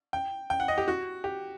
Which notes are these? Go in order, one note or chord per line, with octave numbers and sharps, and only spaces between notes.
G5
G5
F#5
D#5
G4
F#4
G4